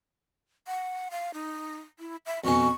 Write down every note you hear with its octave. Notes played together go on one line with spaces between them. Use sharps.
F#5
F5
D#4
E4
E5
F2 B2 C#4 C#6